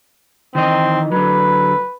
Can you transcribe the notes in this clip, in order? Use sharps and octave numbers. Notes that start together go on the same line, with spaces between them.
D#3 E3 C4 D#5
D3 F#3 B4